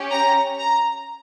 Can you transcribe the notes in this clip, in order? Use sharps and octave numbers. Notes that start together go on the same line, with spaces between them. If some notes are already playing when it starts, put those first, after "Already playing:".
Already playing: C#4 G4
A#5
A#5